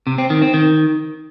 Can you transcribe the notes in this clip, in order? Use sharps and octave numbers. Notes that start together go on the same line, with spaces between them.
C3
C4
D#3
C4
D#3